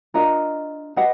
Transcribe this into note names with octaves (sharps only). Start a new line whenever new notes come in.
D4 F4 A#4 D#5
G4 B4 D#5 F#5